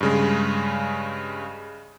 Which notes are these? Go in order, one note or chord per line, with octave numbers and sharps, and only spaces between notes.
G2 C#3 G#3